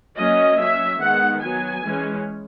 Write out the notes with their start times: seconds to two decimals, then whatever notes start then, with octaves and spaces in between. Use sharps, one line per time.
0.16 F#3 A#3 C#4 D#5
0.58 F#3 C#4 E5
0.99 D#3 G#3 B3 F#5
1.41 F#3 B3 G#5
1.83 E3 G#3 C#4